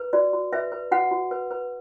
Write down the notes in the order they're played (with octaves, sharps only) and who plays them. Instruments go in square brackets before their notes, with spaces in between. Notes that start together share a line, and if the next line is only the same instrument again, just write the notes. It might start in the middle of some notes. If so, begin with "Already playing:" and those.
Already playing: [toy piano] B4
F#4 D5
F#4
B4 E5
B4
F#4 F#5
F#4
B4
B4